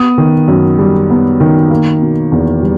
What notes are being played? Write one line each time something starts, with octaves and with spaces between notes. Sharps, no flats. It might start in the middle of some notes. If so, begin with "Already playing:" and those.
Already playing: B3 D#6
D#3
F#2
G3
B3
D#3
A#3
B2
E2
G3